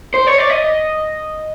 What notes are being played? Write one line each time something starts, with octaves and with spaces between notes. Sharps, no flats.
C5
C#5
D5
D#5